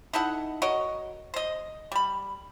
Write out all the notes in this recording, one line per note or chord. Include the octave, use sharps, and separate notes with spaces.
D#4 E4 A4 F#5
F#4 A#4 C#5 D#5
C5 D#5
G3 B5